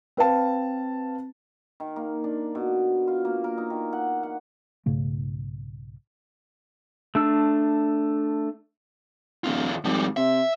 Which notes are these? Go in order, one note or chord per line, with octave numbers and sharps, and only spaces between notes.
C4 B4 F5 A5
D#3
A#3
D4
B2
F4
A#3
A#4
D#4
D#3
F#5
F#5
B1 G#2 C#3 A3
A3 D4 E6
D1 E2 F4
G#1 F3 G3
C3 E5